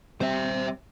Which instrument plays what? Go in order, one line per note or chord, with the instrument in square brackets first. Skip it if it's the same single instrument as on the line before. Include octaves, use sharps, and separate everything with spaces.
[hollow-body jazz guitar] G3 C4 [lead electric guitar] C5 E5